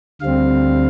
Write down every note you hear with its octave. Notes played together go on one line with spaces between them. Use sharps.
D2 D3 G3 C4 F5